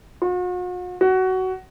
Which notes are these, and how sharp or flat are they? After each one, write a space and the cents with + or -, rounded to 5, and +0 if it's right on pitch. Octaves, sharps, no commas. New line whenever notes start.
F#4 -45
F#4 +15